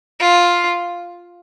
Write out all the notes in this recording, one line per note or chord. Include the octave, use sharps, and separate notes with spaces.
F4